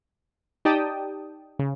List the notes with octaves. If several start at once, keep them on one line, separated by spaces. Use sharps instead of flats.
D#4 G4 D5 G5 A5 D#6
C#3